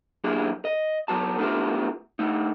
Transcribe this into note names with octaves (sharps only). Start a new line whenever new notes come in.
F#3 A#3 D4 E4 G4 G#4
D#5
F#3 B3 F#4 A5
A3 B3 D4 E4 F4 G4
D3 A3 D#4